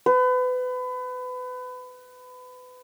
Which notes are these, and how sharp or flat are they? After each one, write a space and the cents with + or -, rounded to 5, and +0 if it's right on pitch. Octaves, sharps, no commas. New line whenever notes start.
B4 +30